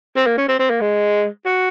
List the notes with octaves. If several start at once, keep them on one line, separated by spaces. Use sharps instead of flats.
C4
A#3
C#4
C4
C4
A#3
G#3
F#4